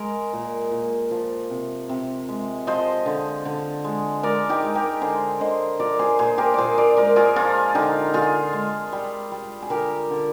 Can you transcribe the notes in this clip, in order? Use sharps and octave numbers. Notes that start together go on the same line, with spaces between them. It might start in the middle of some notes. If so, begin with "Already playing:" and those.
Already playing: G#3 A#4
A#2
A#2
F3
C3
C3
G#3
F3 C5 D#5
D3
D3
G#3
G#3 A#4 D5
D#4 G4
G#3
G4 A#4
D3 G#4 C5
D3 C5 D#5
F3 A#4 D5
G#4 C5
A#2 G#4 C5
G4 A#4
A#2 G#4 C5 D5
A#4 D5
G#3 A#4 D5
F4 G#4
F3 F4 G#4
D3 D#4 G4
D3 F4 G#4
G#3
G3
G3
G#4
D3 G4 A#4
D3